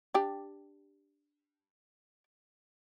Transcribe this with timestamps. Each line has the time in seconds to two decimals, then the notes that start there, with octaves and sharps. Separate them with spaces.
0.14 D4 G4